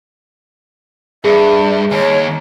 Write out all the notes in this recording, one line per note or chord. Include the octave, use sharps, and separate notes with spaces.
G2 G#4 E5
D#2 C#5